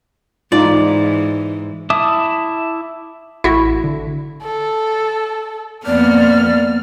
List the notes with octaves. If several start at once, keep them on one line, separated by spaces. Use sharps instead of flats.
G#2 E3 D4 D#4 F4 D5
E4 E5 A5 D6 D#6
A1 E4 F#4
D3
A4
F2 A#3 B3 D5 F6